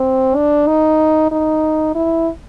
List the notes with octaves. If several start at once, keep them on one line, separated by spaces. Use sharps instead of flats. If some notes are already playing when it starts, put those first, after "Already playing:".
Already playing: C4
D4
D#4
D#4
E4